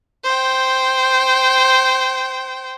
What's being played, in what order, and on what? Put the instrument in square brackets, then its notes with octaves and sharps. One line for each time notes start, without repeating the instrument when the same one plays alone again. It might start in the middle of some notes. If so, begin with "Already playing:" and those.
[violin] C5 G5